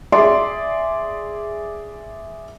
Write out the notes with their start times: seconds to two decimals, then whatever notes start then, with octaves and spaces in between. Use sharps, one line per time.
0.12 G#4 D5 E5 C6